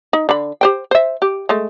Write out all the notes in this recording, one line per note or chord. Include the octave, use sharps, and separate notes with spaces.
D#4
D3 B5
G4 C5 G5
C5 E5
G4
G#3 A3